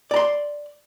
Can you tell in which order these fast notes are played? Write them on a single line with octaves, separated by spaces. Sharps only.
D5 A#5 C6